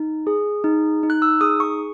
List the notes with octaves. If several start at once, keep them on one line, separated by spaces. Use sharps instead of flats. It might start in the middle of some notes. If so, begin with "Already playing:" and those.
Already playing: D#4
G#4
D#4
D#4
F#6
E6
G#4 D#6
C#6